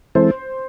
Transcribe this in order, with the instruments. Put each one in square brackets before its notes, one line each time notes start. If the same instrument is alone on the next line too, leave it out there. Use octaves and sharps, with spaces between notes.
[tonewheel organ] E3 G#3 C4 E4 A4 [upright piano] C5